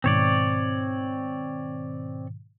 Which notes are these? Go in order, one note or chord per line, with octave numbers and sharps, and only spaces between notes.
G#2 B2 D#3 C4 C#5 D5